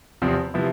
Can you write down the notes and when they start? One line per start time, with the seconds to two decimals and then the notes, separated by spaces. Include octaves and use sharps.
0.22 E2 C3 F3 C4
0.54 C3 F3 B3 E4